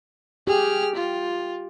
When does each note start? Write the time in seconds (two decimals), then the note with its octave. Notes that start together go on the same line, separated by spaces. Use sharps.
0.47 G4 G#4 F6
0.96 F4